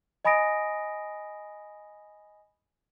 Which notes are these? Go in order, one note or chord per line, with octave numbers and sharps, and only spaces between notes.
D#5 G#5 B5 D#6 A#6 D7